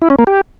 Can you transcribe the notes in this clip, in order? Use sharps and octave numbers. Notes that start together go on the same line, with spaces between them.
E4
C#4
A#3
G4